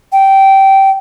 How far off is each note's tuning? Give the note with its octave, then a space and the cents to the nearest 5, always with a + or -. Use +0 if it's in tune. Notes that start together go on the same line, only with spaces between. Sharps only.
G5 -15